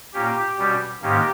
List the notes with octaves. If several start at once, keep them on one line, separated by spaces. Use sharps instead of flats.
A#2 A#3 C#4 G4
B2 G3 C#4
G#2 D#3 A#3 C#4 G4